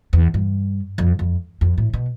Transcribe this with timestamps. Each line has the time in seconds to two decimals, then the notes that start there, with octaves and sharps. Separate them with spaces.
0.13 E2
0.34 G2
0.98 F2
1.19 F2
1.61 F2
1.78 A2
1.93 B2